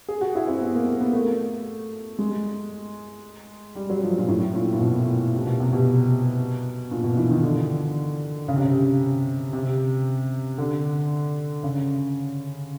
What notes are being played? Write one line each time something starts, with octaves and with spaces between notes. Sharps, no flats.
G#4
F#4
E4
C4
B3
A#3
A#3
B3
A3
G#3
G3
F#3
F3
A#2
A2
A#2
A#2
B2
C3
B2
C3
B2
A#2
B2
E3
D#3
D3
C#3
C3
C#3
C3
D3
C#3